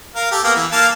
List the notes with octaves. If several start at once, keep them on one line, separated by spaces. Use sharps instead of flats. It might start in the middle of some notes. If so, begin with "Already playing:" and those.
A#4 F5
G4 A4
A#3 B3 F5
E3
A#3 F5 A5